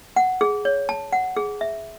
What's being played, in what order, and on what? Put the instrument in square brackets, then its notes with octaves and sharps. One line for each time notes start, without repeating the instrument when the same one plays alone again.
[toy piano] F#5
G#4
C#5
A5
F#5
G#4
E5